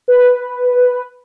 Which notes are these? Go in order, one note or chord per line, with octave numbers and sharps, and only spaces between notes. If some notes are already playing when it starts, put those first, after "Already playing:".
B4